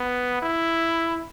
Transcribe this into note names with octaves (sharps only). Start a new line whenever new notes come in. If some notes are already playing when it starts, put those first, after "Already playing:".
Already playing: B3
E4